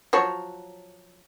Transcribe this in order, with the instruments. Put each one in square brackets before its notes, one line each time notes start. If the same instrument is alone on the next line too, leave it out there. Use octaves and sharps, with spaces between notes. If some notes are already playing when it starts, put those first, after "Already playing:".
[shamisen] F3 F#3 C#5